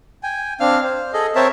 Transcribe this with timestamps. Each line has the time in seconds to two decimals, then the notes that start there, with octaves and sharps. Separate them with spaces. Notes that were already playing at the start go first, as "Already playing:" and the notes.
0.23 G5 G#5
0.60 C4 D4 F5 F6
0.84 C5
1.13 G#4 A4 D#5
1.35 C4 A#4 C5 C#5 E5 A5